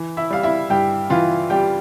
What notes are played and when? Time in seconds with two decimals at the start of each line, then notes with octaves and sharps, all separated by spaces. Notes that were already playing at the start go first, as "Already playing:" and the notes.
Already playing: E3
0.17 E4 E5
0.30 G3 F5
0.43 E4 E5
0.70 G2 G4 G5
1.10 E3 F4 F5
1.50 G3 G4 G5